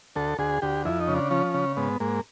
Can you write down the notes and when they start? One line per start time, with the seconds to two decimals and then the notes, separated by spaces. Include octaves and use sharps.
0.16 D2 A4
0.38 D2 G#4
0.62 D2 G4
0.85 F2 E4
1.00 D#4
1.08 C#3
1.15 D4
1.31 F3 C#4
1.54 C#3
1.77 G#2 B3
2.00 G#2 A#3